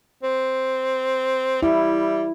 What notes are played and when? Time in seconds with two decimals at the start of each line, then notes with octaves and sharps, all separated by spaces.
0.23 C4
1.63 G3 E4